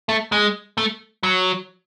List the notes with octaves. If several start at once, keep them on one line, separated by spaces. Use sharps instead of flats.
A3
G#3
A3
F#3